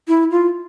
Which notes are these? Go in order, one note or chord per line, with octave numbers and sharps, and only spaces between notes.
E4
F4